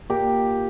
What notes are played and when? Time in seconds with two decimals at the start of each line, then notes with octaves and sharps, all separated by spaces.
0.10 A#2 G4 A#4